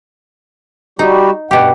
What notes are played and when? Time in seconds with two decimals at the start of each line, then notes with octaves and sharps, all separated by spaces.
0.99 G3 D#4 F#4 G4
1.51 G2 B2 G4 F#5